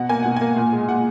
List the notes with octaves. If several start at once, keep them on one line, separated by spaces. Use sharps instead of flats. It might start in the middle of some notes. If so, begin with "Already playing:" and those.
Already playing: B2 F#5
A#3 G#5
B2 F#5
A#3 G#5
A#2
G#3
A#2 F#5